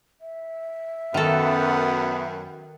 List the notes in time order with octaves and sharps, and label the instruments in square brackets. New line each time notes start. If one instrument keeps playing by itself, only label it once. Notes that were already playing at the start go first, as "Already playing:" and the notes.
[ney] E5
[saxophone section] F#2 [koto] D#3 A4 [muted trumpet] B3